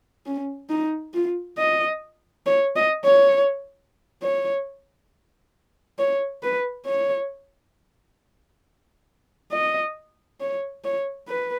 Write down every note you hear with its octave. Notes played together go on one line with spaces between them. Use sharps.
C#4
D#4
F4
D#5
C#5
D#5
C#5
C#5
C#5
B4
C#5
D#5
C#5
C#5
B4